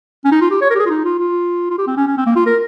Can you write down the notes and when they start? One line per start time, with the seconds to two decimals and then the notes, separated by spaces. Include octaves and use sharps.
0.25 C#4
0.32 D#4
0.41 F4
0.51 G4
0.61 C#5
0.70 A#4
0.75 G4
0.80 G#4
0.86 F4
0.90 D#4
1.05 F4
1.19 F4
1.70 F4
1.78 G4
1.87 C4
1.97 C#4
2.07 C#4
2.18 C4
2.27 A#3
2.36 F4
2.46 A#4